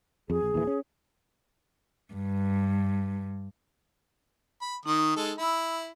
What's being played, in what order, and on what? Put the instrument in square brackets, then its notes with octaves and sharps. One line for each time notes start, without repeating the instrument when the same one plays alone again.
[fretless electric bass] F2 [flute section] G#4
[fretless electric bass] A#1
D#2 A#2 E3
C#4
[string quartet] G2
[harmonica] B5
[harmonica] D#3 D#6 [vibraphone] D#4
[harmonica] G#3 A4
[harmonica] E4 [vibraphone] B5 E6